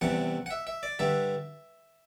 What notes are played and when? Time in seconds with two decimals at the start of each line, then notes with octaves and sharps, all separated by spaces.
0.01 E2 C3 E3 G3 F#5
0.46 F#5
0.51 E5
0.67 E5
0.83 D5
0.99 G2 D3 G3 E5